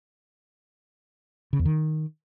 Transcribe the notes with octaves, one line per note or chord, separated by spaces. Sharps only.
C#3
E2
D#3